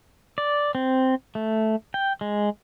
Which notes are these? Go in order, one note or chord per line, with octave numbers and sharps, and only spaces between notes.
D5
C4
A3
G5
G#3